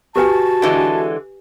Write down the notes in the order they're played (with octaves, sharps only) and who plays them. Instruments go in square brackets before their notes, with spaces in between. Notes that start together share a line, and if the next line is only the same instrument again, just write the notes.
[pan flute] F#4 [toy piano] G4 B4 G#5 [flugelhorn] A5
[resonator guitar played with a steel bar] D3 E3 G#3